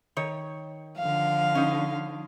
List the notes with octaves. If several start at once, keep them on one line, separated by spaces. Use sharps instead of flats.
D#3 C#5
D3 F3 F5
C#4 D#4